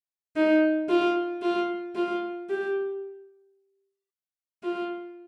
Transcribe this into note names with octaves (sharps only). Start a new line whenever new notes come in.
D#4
F4
F4
F4
G4
F4